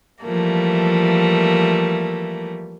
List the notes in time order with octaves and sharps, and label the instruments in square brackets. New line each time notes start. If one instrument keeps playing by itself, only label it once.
[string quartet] E3 F3 G3 A3 A#3